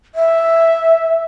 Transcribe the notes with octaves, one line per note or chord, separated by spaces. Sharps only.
E5